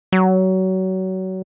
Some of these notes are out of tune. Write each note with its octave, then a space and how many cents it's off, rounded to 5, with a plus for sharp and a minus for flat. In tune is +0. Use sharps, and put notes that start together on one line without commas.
F#3 +25